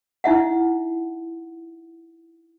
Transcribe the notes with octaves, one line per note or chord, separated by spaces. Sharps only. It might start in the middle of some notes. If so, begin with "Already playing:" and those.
D#4 E4 E5 F#5